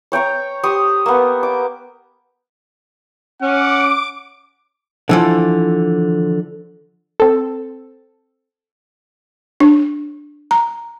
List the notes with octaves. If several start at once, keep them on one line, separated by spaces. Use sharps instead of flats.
C#5 G5 A#5 C#6
G4 C5 C#6 D#6
A#3 B3
D6
C#4 F#5 D6
D3 E3 F3
C4 A4
D4
A#5